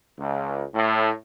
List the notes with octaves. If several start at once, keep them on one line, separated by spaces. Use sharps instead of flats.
C#2
A2